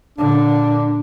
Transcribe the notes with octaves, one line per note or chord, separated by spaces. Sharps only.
A#2 D3 D4